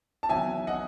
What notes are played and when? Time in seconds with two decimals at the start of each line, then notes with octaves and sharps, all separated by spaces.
0.23 A5
0.29 E2 D#3 F#3 E5 G#5
0.67 D#5 F#5